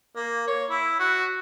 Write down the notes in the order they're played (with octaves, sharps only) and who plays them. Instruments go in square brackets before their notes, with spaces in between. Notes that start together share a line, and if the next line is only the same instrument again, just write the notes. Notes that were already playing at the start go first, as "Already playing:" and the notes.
[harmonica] A#3
C#5
E4
F#4